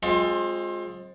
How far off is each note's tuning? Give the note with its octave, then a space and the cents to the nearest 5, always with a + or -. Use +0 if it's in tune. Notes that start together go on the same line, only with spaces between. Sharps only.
G#3 +5 C4 +25 F4 +30